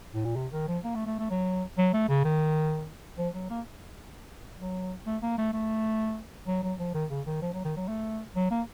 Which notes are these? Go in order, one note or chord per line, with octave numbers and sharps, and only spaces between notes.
A2
A#2
C3
D#3
F3
A#3
A3
A3
A3
F#3
F#3
A3
C#3
D#3
F3
F#3
A#3
F#3
A3
A#3
A3
A3
F#3
F#3
F3
D#3
C#3
D#3
F3
F#3
D#3
F#3
A3
F#3
A#3